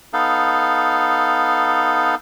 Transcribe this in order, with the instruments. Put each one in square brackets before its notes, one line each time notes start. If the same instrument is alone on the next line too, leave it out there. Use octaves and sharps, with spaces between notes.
[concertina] B3 D#4 A4 F5